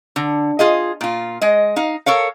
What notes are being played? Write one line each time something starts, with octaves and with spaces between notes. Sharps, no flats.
D3
F4 G#4 D#5
A#2 F4
G#3 D#5
D#4 F5
A4 A#4 C#5 F5